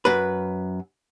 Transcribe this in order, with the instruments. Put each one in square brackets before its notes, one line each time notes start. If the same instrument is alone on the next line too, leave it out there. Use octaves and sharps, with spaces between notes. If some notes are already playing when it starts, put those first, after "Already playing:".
[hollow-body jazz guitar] F#2 B4